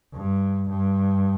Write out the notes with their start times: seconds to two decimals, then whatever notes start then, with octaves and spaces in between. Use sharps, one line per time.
0.14 G2
0.70 G2